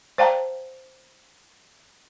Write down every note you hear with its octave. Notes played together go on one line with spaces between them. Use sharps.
C5 D5 F5 G5 A5 A#5